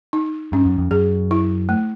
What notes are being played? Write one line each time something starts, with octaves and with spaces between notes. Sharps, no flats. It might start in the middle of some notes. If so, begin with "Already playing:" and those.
D#4
G2 C#4
F#2
F2
F#2 G#4
E4
A3